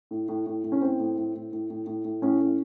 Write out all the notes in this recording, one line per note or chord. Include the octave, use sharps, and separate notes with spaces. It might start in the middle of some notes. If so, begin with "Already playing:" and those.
A2
A2
A2
A2
C#4
A2 C4
A2
A2
A2
A2
A2
A2
A2
A2 C#4
A2